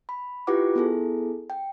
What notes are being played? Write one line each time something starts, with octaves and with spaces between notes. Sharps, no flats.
B5
E4 F4 G4 B4 F#5 D6
B3 E4 G#4 A4
G5